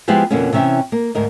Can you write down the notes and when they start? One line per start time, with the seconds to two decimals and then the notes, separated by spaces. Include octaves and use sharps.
0.08 F3 G#3 B3 E4 F4 G4
0.31 F2 B2 D3 A#3 B3 C#4
0.53 C3 E3 C#4 E4 E5 G5
0.92 A#3
1.15 D2 G#2 A#4 D#5